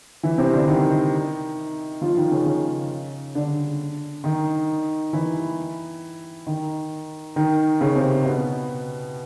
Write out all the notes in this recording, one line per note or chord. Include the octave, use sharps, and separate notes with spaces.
E3 E4
C3 C4
D3 D4
D#3 D#4
F3 F4
D#3 D#4
C#3 C#4
C#3 C#4
D3 D4
D#3 D#4
E3 E4
D#3 D#4
D#3 D#4
C#3 C#4
C3 C4
B2 B3